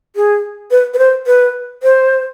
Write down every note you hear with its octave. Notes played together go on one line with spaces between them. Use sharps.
G#4
B4
B4
C5
B4
C5